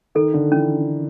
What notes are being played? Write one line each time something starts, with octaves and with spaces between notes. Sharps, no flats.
D#3 A4
D3
E3 C#4